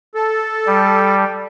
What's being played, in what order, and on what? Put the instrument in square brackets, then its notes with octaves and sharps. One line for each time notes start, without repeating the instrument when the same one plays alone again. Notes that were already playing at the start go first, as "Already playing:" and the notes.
[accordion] A4
[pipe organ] G3